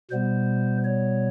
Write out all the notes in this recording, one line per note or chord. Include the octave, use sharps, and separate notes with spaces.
B2 G3 B3 C5
C#5